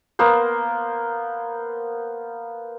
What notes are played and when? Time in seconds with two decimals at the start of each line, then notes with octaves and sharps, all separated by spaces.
0.19 A#3 B3 C5